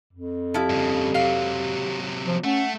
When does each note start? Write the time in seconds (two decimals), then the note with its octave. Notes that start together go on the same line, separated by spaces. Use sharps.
0.13 F2
0.54 F3 E4 G4
0.70 G2 C#3
1.15 C3 F#3 F5
2.27 F3
2.44 A3 C#4 F#5